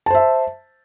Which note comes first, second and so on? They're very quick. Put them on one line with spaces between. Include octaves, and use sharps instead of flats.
A5 C5 E5